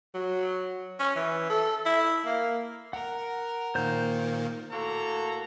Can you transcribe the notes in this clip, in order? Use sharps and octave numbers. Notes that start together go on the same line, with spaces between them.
F#3
C#4
E3
A4
E4
A#3
A#4 F#5
A#2 D#3 A#3 C5 G6
A2 A#3 F#4 A4 A#5